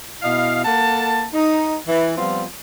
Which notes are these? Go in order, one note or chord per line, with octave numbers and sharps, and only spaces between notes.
B2 E4 D#5 F5
A#3 A4 F#5 A5
D#4
E3
F3 G3 B3 C4 F4